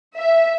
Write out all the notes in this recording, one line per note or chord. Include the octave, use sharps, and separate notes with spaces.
E5